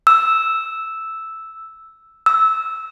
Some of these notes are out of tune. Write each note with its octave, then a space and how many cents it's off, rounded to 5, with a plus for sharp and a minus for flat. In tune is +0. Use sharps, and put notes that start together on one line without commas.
E6 -5
E6 -15